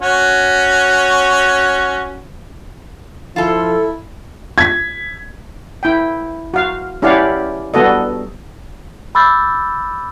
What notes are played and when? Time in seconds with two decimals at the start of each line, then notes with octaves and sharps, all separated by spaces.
0.01 C#4 F#4 C#5
3.36 F3 E4 F4 A4
4.58 G#6 B6
5.83 E4 G5
6.54 F#4 F5
7.02 C#4 E4 G4 D5 F5 F#5
7.74 G3 B3 F#4 A4 D#5
9.15 B5 D6 E6 F6 G6 A6